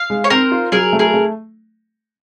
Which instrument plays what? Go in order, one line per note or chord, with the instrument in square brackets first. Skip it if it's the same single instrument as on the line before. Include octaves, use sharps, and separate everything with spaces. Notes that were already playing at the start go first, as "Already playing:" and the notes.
Already playing: [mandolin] F5
[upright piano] G#3
[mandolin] C#5
[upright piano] C4 [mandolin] A#4 C5
[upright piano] F4
[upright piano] F#3 [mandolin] G#4 A#4
[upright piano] A3
[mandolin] G#4 A#4
[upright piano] A3